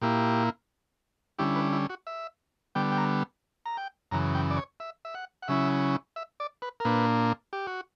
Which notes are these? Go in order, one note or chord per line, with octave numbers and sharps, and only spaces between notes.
A#2 A#3 E4 G4
D3 G3 C#4 E4 G4
B4
E4
F#4
E5
D3 G3 B3 G5
G5
A#5
A#5
G5
F#2 C#3 E3 A#5
G5
D5
C#5
E5
E5
F#5
F#5
C#3 F#3 C#4 E4 E5
E5
D5
B4
A#4
A#2 A#3 D4 B4
G4
F#4